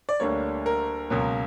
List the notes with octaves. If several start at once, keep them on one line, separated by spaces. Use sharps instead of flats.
D5
D2 D3 G3 A#3 C#5
A#4
C#2 B2 F#3 A#3